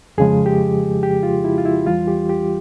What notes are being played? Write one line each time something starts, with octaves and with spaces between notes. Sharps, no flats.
F2 C#3 F3 G#3 G#4
G4
G4
F4
E4
F4
E4
E2 E3 G3 F4
G4
G4